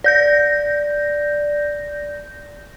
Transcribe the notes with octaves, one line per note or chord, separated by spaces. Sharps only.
D5 G6 A#6